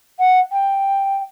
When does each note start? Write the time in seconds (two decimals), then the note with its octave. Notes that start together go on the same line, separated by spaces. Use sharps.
0.19 F#5
0.51 G5